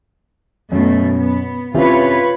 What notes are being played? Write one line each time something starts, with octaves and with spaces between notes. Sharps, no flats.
F#2 B2 A3
B3
C3 C#4 E4 F4 B4 C#5